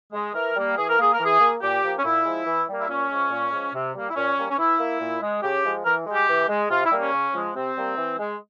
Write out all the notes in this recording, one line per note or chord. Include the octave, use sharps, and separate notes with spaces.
G#3
E3 A#4
G3 A#3
E3 G#4
A#4
A#3 G#4
A#4
E3 G#4
A#3
A#2 G4
F3 A#3
C#4
A#2 E4
F3 G#3
E3
G3 A#3
E4
A#2 C#4
F3 G#3
A#2
F3 G#3
C3
G3 A#3
E4
A#2 C#4
G3 A#3
C#4
E3 E4
A#3
A#2
G#3
C#3 G4
F3 G#3
E3 A#4
G#3
G4
E3
G#3
C3 F4
E4
G3 A#3
C#4
C#3
F3 G#3
C3 C4
G3 A#3
E3
G#3